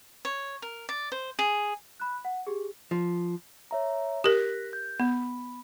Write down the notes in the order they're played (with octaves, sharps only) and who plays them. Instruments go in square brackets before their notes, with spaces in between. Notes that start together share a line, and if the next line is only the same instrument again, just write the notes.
[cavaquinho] C#5
A#4
D5
C5
G#4
[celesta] B5 F#6
F#5
G4 G#4
[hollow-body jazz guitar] F3
[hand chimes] C#5 E5 A#5
[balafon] G4 A#4 [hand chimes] F#6 A#6 B6
[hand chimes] G6
[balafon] B3 [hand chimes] B5